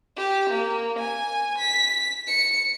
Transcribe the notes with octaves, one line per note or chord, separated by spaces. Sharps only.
G4
A#3
G#5
B6
C#7